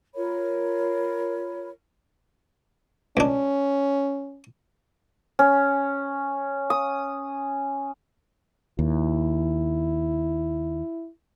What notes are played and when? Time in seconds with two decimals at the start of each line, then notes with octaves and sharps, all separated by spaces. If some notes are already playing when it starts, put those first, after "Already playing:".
0.15 F4 A#4 C#5 B5
3.17 C#2 C#4 D4
5.39 C#4
6.70 D#6
8.79 D#2 E4